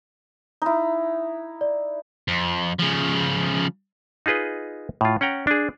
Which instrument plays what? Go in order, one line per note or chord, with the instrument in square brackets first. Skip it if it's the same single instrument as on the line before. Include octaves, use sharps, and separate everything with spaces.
[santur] D#4 E4
[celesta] D5
[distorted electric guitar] F2
C#3 F3
[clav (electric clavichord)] D#4 F4 G#4 B4 D#5
A2 F4
C#4 F#5 G5 A#5
D4 G#4